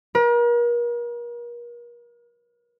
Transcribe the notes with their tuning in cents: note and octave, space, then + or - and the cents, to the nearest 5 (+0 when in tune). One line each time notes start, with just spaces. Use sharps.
A#4 +40